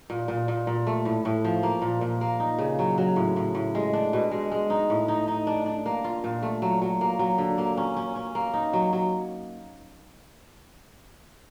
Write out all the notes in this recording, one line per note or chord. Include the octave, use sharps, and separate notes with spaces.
A#2
A#2
A#2
A#2
A3
A2
A2
F3
A#3
A#2
A#2
A#3
D#4
C#3
F#3
F#3
A2
A2
A2
G#3
D4
B2
G#3
G#3
D#4
A2
D#4
D#4
D4
D4
A#3
F4
A#2
A3
F#3
F#3
A#3
F#3
D3
A#3
C#4
C#4
C#4
A#3
D#4
F#3
F#3